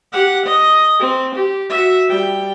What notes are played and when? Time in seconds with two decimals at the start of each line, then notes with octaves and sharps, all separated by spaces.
0.13 G4 F#5
0.46 D#5
1.00 C4
1.35 G4
1.70 F#4 E5
2.09 G3 G5